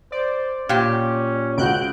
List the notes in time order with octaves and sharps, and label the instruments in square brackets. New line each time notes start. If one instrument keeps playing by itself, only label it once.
[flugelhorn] C5 [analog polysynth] D5
[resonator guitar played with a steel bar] A#2 G4 [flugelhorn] C#4
[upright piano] C#2 F#4 [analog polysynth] F#6 G6 D7